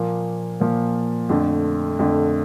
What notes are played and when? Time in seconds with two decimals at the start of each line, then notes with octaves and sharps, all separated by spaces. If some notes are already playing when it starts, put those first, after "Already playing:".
Already playing: A#2 F3 A#3
0.60 A#2 F3 A#3
1.29 F2 D3 A3
1.99 F2 D3 A3